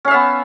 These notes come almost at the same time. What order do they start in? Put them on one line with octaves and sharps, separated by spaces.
C#4 F5 E5 B3